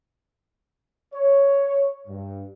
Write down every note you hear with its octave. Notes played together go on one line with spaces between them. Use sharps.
C#5
G2